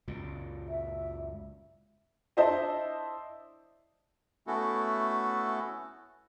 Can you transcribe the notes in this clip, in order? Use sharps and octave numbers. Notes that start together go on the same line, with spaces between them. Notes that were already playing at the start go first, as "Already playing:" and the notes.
C#2 F#2 A#2
E5
D4 E4 C5 D#5 E5 A5
A3 B3 C#4 E4 F#4 A4